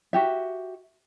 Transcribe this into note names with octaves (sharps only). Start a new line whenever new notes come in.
F#4 G4 E5